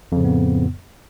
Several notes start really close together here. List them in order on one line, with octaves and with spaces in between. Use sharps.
F2 C#3 A2 B3